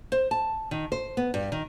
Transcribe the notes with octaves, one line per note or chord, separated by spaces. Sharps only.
C5
A5
D#3
C5
B3
G2
D#3